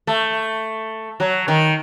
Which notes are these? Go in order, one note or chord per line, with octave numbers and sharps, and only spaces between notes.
A3
F#3
D#3